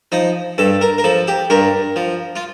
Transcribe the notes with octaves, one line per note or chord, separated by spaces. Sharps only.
F3 D#4
G2 A4
A#4
A#4
F3 A4
G4
G2 A#4
F3
F4